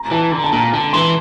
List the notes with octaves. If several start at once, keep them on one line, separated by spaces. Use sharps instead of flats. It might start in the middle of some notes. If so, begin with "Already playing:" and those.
Already playing: A#5
E3 A5
D3 A#5
A5
A#2 A#5
D3 A5
E3 C6